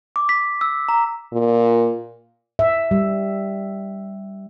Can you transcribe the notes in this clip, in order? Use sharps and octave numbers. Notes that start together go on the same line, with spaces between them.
D6
B6
E6
A#5
A#2
E5
G3